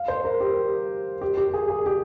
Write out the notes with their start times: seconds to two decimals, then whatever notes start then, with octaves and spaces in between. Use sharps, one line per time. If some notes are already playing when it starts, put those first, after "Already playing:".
Already playing: F5
0.08 C5
0.25 A#4
0.41 G4
1.21 G4
1.37 G4
1.54 G#4
1.70 G#4
1.86 G4